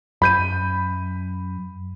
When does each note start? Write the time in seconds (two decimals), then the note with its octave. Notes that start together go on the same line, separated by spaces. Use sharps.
0.22 F#2 B5 G6 D#7